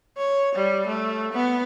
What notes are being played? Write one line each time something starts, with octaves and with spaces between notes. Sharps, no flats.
C#5
G3
A3
B3